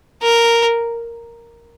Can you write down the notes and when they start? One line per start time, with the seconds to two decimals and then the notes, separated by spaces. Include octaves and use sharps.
0.22 A#4